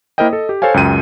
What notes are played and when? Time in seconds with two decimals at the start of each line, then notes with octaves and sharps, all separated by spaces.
0.18 A#3 E4 A#4 C5 D#5 G5
0.29 A4 D#5
0.49 G4
0.62 A4 C5 C#5 F5 G#5
0.74 C#2 F#2 G5 D#7